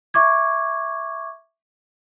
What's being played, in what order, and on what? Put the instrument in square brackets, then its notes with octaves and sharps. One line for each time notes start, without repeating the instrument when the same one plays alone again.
[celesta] E5 C#6 D6 G#6